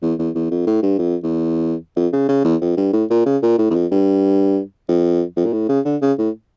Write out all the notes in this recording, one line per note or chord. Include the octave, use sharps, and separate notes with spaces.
E2
E2
E2
F2
A2
G2
F2
E2
F2
C#3
C#3
E2
F2
G2
A2
A#2
C#3
A#2
A2
E2
F2
G2
F2
F2
A#2
A2
C#3
D3
C#3
A2